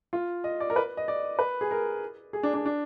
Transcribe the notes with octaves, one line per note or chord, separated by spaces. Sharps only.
F4
D#5
D5
A#4
B4
D#5
D5
B4
G#4
A#4
G#4
D4
D4
D4